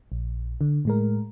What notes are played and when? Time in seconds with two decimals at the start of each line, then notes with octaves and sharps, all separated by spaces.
0.12 A#1
0.61 D3
0.85 A2 G#3 A#4